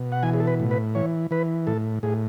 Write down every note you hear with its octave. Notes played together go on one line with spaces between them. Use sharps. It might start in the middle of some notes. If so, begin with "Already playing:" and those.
Already playing: B2
F#5
E3 G#5
G#4
A4
B4
A2
B4
E3 C#5
E3 B4
A2 A4
A2 G#4